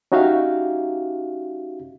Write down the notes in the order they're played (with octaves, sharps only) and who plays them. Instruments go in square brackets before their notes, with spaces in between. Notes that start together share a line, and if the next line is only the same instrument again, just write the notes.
[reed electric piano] C#4 D#4 F#4 G4 E5 F5